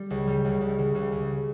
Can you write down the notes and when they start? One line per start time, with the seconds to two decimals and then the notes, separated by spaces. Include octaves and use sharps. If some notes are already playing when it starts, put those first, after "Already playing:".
Already playing: G3
0.10 C#2
0.27 G3
0.45 C#2
0.61 C#2
0.79 C#2
0.95 C#2
1.12 C#2